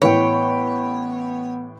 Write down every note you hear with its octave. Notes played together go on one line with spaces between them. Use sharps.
A1 A2 B3 B4 C#5 G5